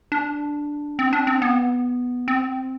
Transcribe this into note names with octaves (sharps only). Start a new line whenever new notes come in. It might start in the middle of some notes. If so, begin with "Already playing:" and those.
D4
C4
D4
C4
B3
C4